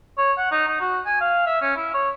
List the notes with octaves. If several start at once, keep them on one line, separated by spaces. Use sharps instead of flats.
C#5
F#5
D#4
D#4
F#4
G#5
F5
E5
C#4
E4
C#5